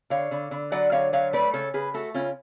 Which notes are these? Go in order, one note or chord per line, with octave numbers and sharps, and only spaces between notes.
D3 C#5 F5
D3
D3
F#3 D5 F#5
D3 C#5 F5
F#3 C#5 F5
A3 B4 D5
C#3 A4 C#5
C#3 G#4 B4
A3 F#4 A4
C#3 C#4 F4